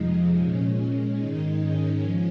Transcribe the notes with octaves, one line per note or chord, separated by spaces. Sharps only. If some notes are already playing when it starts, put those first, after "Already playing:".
Already playing: F2 C3 F3 G#3 D#4
A#2 G#3 C#4
G#2 D#3 G#3 D#4
C#4
F3 G#3